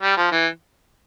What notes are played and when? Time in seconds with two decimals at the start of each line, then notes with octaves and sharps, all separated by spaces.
0.02 G3
0.17 F3
0.32 E3